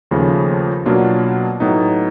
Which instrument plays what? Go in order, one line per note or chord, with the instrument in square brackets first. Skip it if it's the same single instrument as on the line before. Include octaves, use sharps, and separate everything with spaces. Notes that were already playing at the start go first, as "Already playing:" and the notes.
[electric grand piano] D#2 C#3 F3 A3
B2 F#3 A#3 D4 F4
A2 F#3 B3 D#4